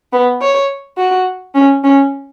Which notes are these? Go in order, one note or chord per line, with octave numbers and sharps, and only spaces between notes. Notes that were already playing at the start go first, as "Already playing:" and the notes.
B3
C#5
F#4
C#4
C#4